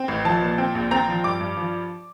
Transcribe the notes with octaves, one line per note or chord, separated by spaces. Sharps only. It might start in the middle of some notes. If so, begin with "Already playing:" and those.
Already playing: C4
A1
F3 A5
A#2
C4
A#1
C4 A#5
F3
G2 D6
G2
F3